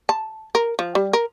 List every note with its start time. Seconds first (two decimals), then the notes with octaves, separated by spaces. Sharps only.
0.09 A5
0.55 A#4
0.79 F3
0.95 G3
1.13 A#4